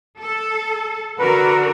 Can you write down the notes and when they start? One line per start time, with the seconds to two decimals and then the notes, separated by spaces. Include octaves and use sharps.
0.19 A4
1.19 D3 F#4 A#4 B4